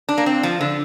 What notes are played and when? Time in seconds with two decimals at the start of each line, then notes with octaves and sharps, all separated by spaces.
0.09 D4
0.18 A#3
0.26 C4
0.43 F3
0.61 D3